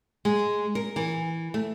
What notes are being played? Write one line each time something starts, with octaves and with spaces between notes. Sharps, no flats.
G#3
A#4
E3
A3